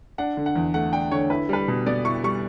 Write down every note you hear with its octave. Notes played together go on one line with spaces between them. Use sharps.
D4 F#5
D3
F#5
E2
A3 F#5
D4 G5
D3 C#5
E4 B4
G3 B4
B2
B3 D5
E4 C#6
G3 C#6